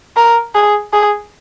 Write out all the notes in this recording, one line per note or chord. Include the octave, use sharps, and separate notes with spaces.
A#4
G#4
G#4